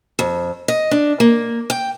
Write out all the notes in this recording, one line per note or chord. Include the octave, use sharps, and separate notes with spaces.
F2
D#5
D4
A#3
G5